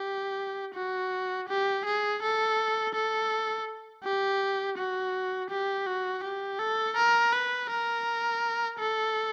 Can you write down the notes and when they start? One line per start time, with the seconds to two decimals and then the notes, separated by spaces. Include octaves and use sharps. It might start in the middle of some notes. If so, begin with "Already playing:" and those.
Already playing: G4
0.75 F#4
1.49 G4
1.85 G#4
2.22 A4
2.95 A4
4.04 G4
4.78 F#4
5.50 G4
5.86 F#4
6.23 G4
6.59 A4
6.97 A#4
7.33 B4
7.70 A#4
8.79 A4